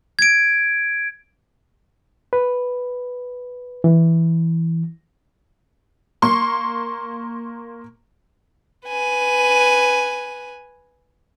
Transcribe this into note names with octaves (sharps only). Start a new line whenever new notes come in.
G#6 D7
B4
E3
A#3 C6 C#6
B4 G#5